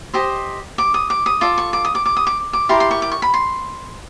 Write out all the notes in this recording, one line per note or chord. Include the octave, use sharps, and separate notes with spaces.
G4 C5 D#5
D6
D#6
D6
D#6
F4 A4 D5 D6
C#6
D6
D#6
D6
D6
D#6
D6
D6
E4 G4 A#4 D5 C6
C6
C#6
D6
C#6
B5
C6